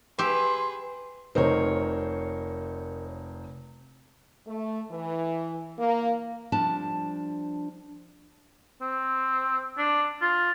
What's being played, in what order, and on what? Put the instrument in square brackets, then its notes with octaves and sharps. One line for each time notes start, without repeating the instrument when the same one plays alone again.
[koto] G4 E5 [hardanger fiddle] G#4 B4 [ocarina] C6
[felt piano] F1 D#4 C5 [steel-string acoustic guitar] A#4 C#5
[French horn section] A3
E3
A#3
[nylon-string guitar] F3 G3 D4 A5
[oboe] C4
D4
F4